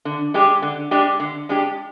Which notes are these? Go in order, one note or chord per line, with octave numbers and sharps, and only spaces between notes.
D3
G#3 D4 G4
D3
G#3 D4 G4
D3
G#3 D4 G4